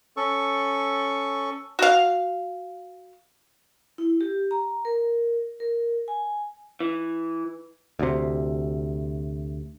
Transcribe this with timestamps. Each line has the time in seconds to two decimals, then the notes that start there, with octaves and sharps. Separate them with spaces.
0.17 C#4 A4 C#6
1.79 F#4 F5
3.98 E4
4.21 G4
4.51 A#5
4.85 A#4
5.60 A#4
6.08 G#5
6.80 E3
7.99 D2 C3